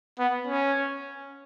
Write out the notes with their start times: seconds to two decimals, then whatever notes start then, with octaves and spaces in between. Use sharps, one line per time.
0.19 B3
0.47 C#4